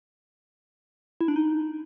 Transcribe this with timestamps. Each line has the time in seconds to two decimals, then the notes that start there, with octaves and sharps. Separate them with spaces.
1.21 E4
1.28 D4
1.36 D#4